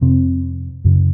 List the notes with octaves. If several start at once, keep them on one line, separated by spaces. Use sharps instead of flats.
F2 C3 C4
F#2 C#3